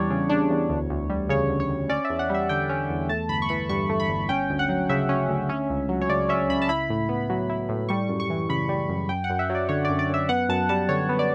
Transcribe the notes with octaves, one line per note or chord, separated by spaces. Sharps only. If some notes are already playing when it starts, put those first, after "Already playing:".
Already playing: E2 G3 D4 C#5 D5
C#3
D4
E2
D2
D2
G3
C#3 C#5
D2
C#5
D2
C#4 D5
E5
E2
F#5
G3 E5
D3 G5
C#4
E2
A3 A5
G1 B5
C#6
E3 B5
G2 C#6
A3
B5
G1
C#4 G5
D2
F#5
F#3
C#3 E5
C#4
D2
C#4
C#2
F#3
C#5
C#3 D5
C#4 E5
C#2 B5
A5
E4 B5
A2
B3
F#3
E4
A2
G3 C#6
F#2
C#6
E3
C#3 B5
G3
F#2
F#2 G5
F#5
F#2
E5
F#3
D5
D3 C#5
F#2 D5
D5
F#2 E5
B3 F#5
F#2 A5
G3 A5
D3 C#5
B3
D5